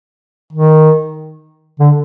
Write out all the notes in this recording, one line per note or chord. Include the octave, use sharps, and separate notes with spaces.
D#3
D3